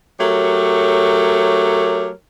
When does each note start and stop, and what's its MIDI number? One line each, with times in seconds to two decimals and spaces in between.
0.20 2.10 54
0.20 2.10 57
0.20 2.10 67
0.20 2.10 70
0.20 2.10 73